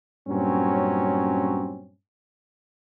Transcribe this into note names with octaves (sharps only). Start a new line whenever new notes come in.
G2 A#2 F#3 C4 C#4